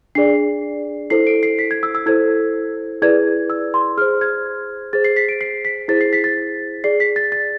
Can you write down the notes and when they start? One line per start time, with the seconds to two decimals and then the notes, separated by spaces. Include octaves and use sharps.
0.15 D4 G#4 D5 C7
1.10 E4 A4 C5 C7
1.27 D7
1.43 C7
1.59 B6
1.71 G#6
1.83 E6
1.95 E6
2.06 E4 A4 C5 G#6
3.02 E4 G#4 B4 D5 G#6
3.50 E6
3.74 C6
3.97 G#4 C5 F6
4.21 G#6
4.93 G#4 C5 A6
5.05 C7
5.17 B6
5.29 D7
5.41 C7
5.65 B6
5.88 E4 G#4 C5 A6
6.01 C7
6.13 B6
6.24 A6
6.84 G#4 D5 C7
7.00 B6
7.16 A6
7.32 A6